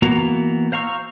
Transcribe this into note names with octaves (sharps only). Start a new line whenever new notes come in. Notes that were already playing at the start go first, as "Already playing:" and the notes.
E3 A#3 B3 F#4 A#5
C5 F5 A#5 C#6 E6